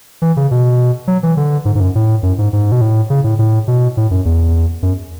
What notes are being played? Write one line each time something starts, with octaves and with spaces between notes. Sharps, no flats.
E3
C#3
B2
F#3
E3
D3
G#2
G#2
F#2
A2
F#2
G#2
G#2
B2
A2
C#3
A2
A2
B2
A2
F#2
E2
F#2